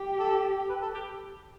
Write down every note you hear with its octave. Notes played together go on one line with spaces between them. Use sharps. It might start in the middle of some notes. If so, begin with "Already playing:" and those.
Already playing: G4
A4
B4
A4
G4